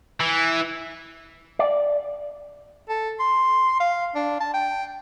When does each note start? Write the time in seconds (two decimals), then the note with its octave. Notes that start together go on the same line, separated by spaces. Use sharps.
0.20 E3
1.59 D5
2.89 A4
3.20 C6
3.80 F5
4.15 D4
4.40 A5
4.54 G5